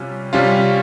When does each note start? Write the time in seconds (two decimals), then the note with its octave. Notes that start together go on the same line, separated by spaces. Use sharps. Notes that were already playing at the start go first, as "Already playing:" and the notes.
Already playing: C3 G3 C#4 F4
0.33 C3 G3 C#4 F4